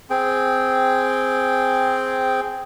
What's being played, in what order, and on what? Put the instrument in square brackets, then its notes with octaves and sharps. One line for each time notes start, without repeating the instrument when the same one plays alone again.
[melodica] C4 G#4 G5